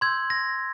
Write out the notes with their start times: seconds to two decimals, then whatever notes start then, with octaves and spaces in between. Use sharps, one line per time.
0.01 C6 E6 G6 G#6
0.30 A#6